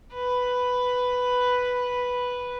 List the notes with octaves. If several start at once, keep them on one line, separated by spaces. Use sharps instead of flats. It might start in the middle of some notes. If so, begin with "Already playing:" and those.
B4